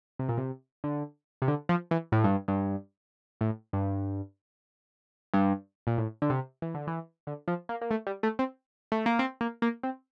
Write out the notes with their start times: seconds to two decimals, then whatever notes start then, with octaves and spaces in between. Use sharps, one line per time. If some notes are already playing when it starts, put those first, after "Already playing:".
0.19 C3
0.29 A#2
0.37 C3
0.84 D3
1.42 C3
1.48 D3
1.69 F3
1.91 E3
2.12 A2
2.24 G2
2.48 G2
3.41 A2
3.73 G2
5.34 G2
5.87 A#2
5.98 A2
6.22 D3
6.30 C3
6.62 E3
6.74 D3
6.87 E3
7.27 D3
7.48 F3
7.69 A#3
7.81 A#3
7.91 A3
8.07 G3
8.23 A3
8.39 C4
8.92 A3
9.06 A#3
9.19 C4
9.41 A#3
9.62 A#3
9.83 C4